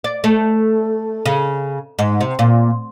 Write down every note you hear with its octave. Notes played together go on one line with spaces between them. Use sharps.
D5
A3
C#3
G#2
C3
A#2